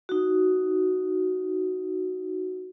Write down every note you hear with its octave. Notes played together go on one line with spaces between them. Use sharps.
D#4 F#4